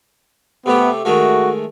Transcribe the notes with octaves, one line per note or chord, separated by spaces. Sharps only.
C3 A3 B3 G4
D#3 G#3 A3 F#4